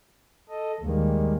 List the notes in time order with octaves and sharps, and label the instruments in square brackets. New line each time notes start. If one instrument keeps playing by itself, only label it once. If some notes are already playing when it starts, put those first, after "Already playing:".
[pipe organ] A4 D#5
[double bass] D#2 D#3 [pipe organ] G3 G#3 A#3